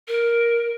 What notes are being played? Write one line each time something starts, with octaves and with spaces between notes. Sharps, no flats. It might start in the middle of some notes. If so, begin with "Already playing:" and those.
A#4